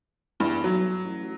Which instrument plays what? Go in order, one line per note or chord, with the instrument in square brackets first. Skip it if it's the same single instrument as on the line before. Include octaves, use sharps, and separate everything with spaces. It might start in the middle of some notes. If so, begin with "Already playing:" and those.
[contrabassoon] E2 [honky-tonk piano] G2
[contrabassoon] B1 [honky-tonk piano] F#3
[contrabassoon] A1